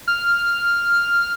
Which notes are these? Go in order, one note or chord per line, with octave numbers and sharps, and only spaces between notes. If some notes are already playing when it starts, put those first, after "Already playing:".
F6